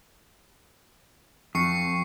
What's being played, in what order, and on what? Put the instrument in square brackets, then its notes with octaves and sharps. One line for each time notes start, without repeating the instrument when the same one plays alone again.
[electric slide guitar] F2 [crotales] C#6 C7 C#7